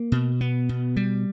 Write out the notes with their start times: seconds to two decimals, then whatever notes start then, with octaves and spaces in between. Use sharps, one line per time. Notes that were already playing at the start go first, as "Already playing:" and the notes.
Already playing: A#3
0.12 B2
0.41 B3
0.69 B2
0.96 G3